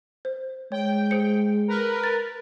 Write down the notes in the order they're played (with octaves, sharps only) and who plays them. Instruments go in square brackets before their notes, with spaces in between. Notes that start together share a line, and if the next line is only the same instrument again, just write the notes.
[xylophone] C5
[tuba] G#3 [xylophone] C#5 [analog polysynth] G5
[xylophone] G#4 C5 C#7
[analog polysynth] A#4 B4
[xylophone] A6